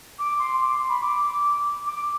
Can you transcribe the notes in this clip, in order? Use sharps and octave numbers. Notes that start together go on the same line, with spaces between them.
D6
C6
D6
C6
B5
D6
D6